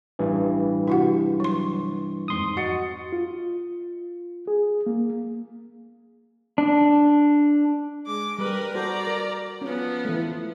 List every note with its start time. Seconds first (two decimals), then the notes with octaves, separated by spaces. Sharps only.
0.19 A1 G2 E3
0.88 C3 G3 E4 F#4 F#5
1.40 F#3 C6
2.28 F2 G#2 C6 D#6
2.57 F#4 D#5 F#5 A6 C#7
3.13 F4
4.47 G#4
4.86 A#3
6.58 D4
8.06 G#3 D6
8.38 G3 A#4 B4
8.74 F#4 A4 C5 D5 A#5
9.07 A#4
9.61 F3 B3 C#4
10.05 E3 A3